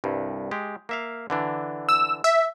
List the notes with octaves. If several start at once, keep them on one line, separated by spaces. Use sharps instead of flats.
C2 G2
G#3 G4
A#3 E5 F5
D3 E3 D4
E6
E5